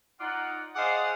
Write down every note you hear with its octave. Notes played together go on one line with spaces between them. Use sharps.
D#4 F4 D5 F#5
G#4 C5 D5 D#5 F5 F#5